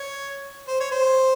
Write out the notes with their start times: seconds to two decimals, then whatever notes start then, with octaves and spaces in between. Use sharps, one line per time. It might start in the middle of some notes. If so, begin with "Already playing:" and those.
Already playing: C#5
0.68 C5
0.80 C#5
0.92 C5